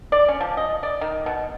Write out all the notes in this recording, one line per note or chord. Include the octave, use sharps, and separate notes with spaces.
D5
C#4
F3
D#5
D5
D#3
B2